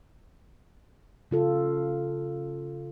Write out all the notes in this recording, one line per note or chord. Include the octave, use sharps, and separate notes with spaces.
C#3 F4 A4